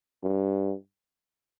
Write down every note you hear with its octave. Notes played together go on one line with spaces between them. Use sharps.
G2